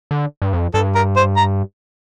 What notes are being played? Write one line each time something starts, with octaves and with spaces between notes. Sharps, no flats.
D3
G2
F2
G2 A4
A#4
C5
A#5